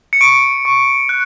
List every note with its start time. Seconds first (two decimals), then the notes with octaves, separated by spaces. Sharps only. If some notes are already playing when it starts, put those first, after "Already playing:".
0.13 C#7
0.21 C#6 D7
0.65 C#6
1.09 F#6